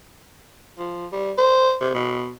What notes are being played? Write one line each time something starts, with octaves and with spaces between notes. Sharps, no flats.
F3
G3
C5
C3
B2